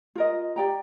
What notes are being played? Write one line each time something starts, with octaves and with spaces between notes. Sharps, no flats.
F4 A#4 D#5
G4 D5 G5 A#5